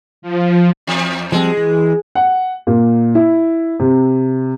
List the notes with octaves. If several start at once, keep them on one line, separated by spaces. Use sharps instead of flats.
F3
E2
F3 G3 G#3 C4
E3
F#5
A#2
E4
C3